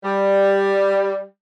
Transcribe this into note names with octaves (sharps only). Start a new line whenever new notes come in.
G3